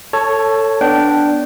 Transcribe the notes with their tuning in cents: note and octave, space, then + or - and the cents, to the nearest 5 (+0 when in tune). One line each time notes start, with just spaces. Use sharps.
A4 +20 C#5 +0 A5 -10
B3 +0 D4 +0 G5 -20